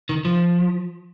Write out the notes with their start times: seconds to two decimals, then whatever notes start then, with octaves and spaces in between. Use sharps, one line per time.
0.09 D#3
0.25 F3